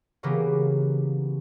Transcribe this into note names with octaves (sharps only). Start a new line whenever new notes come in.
C#3 E3 F#3 A#3 B3 G4